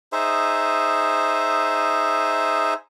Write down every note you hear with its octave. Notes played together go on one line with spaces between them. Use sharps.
D#4 G#4 C5 E5